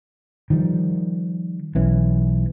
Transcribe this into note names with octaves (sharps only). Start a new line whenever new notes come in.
D#3 F3 G3
B1 E3 C#4